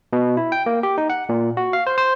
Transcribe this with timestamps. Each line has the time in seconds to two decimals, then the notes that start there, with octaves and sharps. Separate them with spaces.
0.13 B2
0.37 E4
0.52 G5
0.66 A#3
0.83 G4
0.98 D#4
1.10 F#5
1.29 A#2
1.57 F#4
1.73 F5
1.87 C5
1.98 C5